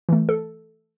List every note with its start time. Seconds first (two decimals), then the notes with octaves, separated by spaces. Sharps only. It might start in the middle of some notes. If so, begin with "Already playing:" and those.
0.09 E3 A3
0.29 A4